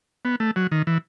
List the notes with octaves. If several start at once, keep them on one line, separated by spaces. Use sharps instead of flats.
B3
A3
F#3
D#3
E3